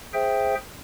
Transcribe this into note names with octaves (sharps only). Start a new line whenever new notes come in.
G#4 C5 E5 G5